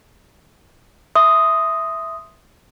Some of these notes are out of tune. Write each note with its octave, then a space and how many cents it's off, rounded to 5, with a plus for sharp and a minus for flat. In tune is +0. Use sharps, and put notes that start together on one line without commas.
E5 +0 C6 +0 D#6 +0